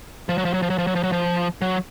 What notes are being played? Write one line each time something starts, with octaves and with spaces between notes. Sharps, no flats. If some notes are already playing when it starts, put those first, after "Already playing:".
F3
F#3
F3
F#3
F3
F#3
F3
F#3
F3
F#3
F3
F#3